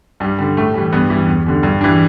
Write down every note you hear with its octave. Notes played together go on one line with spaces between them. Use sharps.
G2 G3
D3 G3
A2 A3
E3 G3
G2 B3
E3 G3
E2
D3 G3
G2
E3 G3 D4